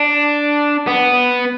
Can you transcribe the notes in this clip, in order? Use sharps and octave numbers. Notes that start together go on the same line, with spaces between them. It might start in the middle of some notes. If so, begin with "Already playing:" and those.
Already playing: D4
B3